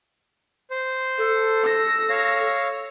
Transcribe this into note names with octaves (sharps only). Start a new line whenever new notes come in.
C5
A4
E6 A#6
C#5 F5